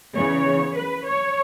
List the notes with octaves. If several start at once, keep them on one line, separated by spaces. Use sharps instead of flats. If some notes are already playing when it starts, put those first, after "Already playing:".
E2 C#3 E3 C#5
B4
C#5